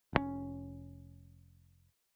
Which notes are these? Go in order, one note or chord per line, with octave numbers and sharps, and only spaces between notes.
F1 A#2 C#4